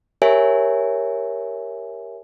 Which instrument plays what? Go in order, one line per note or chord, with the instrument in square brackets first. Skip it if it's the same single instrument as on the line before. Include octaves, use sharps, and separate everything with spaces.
[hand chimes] G4 A#4 C#5 E5 G#5